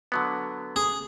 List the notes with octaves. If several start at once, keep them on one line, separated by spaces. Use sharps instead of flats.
D3 F#3 B3
G#4